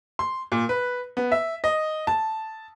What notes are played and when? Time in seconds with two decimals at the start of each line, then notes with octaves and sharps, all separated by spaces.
0.19 C6
0.52 A#2
0.69 B4
1.17 B3
1.32 E5
1.64 D#5
2.07 A5